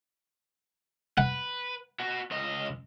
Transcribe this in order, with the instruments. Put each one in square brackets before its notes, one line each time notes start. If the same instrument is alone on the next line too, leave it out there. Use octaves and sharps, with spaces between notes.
[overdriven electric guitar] B4 [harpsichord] F#5
[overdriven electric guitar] B3 F#4
C#2 D#5